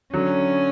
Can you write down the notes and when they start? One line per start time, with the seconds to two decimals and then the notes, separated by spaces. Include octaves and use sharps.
0.14 D3 F#3 C#4